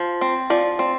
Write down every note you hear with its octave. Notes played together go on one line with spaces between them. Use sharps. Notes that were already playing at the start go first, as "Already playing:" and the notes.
Already playing: F3
C4
F3 D5
C4